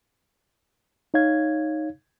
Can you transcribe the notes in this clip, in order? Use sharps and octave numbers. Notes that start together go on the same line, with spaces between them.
D#4 C#5 F5 G#6